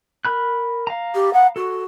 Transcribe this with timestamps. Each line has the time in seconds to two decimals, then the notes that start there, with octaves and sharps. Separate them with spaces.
0.25 A#4 B5 F#6
0.87 F5 A#5
1.14 G4
1.33 F#5
1.56 F#4 A4